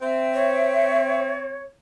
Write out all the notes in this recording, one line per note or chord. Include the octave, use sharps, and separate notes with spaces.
C4 E5
C#5